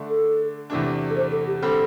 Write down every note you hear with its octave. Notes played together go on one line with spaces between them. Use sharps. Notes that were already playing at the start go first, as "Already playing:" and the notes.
Already playing: D3 A3 D4
A4
E2 C3 A3 D4
A4
C5
A4
G4
D3 G3 C4 A4